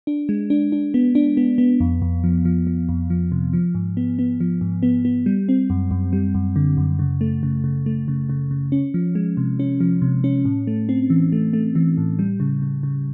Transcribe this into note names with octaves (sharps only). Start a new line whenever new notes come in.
D4
G#3
D4
D4
B3
D4
B3
B3
F2
F2
F3
F3
F3
F2
F3
C3
F3
G#2
B3
B3
F3
G#2
B3
B3
G3
C4
F#2
F#2
G3
F#2
D3
F#2
C#3
A3
C#3
C#3
A3
C#3
C#3
C#3
C#4
F3
G#3
C3
C#4
F3
C3
C#4
A2
A3
C4
E3
A3
A3
E3
A2
G3
C#3
C#3
C#3